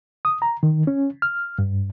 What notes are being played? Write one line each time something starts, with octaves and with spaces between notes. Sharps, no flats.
D#6
A#5
D#3
C#4
F6
G2